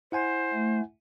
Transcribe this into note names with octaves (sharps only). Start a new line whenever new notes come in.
E4 C5 F#5 G#5
A3